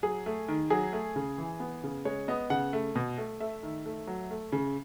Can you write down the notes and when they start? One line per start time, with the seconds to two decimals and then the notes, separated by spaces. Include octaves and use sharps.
0.03 F#3 G#4
0.26 A3
0.48 D#3
0.70 F#3 G#4
0.93 A3
1.16 C#3
1.38 E3
1.60 B3
1.84 C#3
2.05 G#3 C#5
2.28 B3 D#5
2.50 C#3 F#5
2.73 A3
2.95 B2
3.18 A3
3.40 A3 E5
3.63 D#3
3.86 A3
4.07 F#3
4.31 A3
4.52 C#3